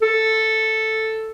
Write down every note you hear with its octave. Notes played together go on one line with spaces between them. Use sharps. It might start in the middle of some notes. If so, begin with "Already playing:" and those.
A4